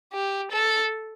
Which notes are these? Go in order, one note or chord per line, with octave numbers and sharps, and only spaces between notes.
G4
A4